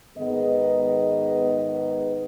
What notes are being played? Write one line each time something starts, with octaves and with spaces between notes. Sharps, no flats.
G#2 D#3 B3 G#4 B4 D#5